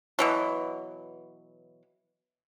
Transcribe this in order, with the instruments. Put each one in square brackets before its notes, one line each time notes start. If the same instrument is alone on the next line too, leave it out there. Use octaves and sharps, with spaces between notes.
[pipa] B2 E3 F#3